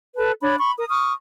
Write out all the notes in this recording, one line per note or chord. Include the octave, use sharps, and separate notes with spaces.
A4 B4 A5
D4 C#5 B5
B5 C#6
A#4 D#6
C#6 D#6 F6